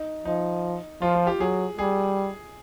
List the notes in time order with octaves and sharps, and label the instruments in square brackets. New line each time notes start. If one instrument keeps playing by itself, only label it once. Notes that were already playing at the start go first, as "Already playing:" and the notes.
Already playing: [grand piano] D#4
[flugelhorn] F3 [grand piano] D#4
[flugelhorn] F3 [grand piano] F4
[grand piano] F4
G4
[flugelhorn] F#3 [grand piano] G#4
[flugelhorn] G3 [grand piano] G#4